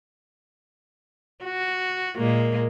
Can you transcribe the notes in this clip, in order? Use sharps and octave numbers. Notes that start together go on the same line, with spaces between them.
F#4
A#2 G#3 A#3